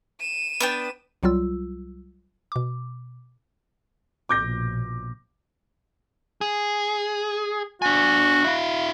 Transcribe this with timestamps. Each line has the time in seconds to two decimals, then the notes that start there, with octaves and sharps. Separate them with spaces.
0.20 D#7 E7
0.60 B3 D4 G5
1.23 C2 F#3 G3 F4 E6
2.52 B2 D6
4.29 A#1 B2 D6 G6 A#6
6.41 G#4
7.82 D4 F#4 G#5
8.44 E4 F5